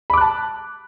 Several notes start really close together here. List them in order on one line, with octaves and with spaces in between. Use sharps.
B5 D6 F#6 A5